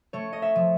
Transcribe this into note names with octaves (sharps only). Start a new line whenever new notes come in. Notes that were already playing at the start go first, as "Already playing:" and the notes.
A3 C#5
D#5
E5
F3